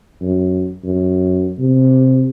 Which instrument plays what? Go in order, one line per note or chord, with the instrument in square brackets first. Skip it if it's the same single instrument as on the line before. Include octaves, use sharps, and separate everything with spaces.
[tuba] F#2
F#2
C3